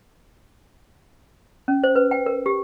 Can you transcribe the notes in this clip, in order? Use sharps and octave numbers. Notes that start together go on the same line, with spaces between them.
C#4
C5
B4
G5
A#4
G4